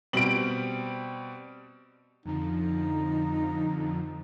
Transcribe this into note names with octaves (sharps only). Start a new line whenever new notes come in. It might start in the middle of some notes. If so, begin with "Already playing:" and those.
B2 G3 C4 D7 F#7
F2 D3 F3 D#4